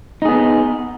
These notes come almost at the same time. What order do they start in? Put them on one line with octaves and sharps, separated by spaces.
D#4 G#4 B3